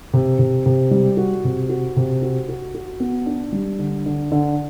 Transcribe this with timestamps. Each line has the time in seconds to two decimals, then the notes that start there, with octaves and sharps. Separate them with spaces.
0.13 C3
0.39 C3
0.66 C3
0.91 G3
1.17 F#4
1.44 C3
1.69 F#4
1.96 C3
2.22 F#4
2.49 F#4
2.75 F#4
3.00 B3
3.26 D4
3.53 G3
3.79 D3
4.06 D3
4.32 D3